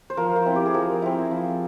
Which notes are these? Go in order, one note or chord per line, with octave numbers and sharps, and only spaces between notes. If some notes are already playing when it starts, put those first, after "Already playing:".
C5
F3 A#4
F4
C4 E4
G4
G#4
F3 A#4
C4 E4
F3